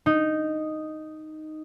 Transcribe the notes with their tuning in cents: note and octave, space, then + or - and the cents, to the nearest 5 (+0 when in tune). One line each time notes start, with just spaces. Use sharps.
D#4 -5